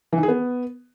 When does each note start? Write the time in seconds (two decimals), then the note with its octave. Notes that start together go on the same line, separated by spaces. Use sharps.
0.13 E3
0.18 D#3
0.23 G#4
0.28 B3